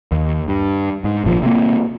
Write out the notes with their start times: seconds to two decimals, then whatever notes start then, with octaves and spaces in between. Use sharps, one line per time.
0.12 D#2
0.48 G2
1.04 G#2
1.24 G#1 A#2 F3
1.42 C3 A#3